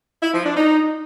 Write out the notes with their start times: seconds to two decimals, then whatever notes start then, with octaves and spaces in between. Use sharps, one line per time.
0.23 E4
0.34 F3
0.45 D4
0.57 D#4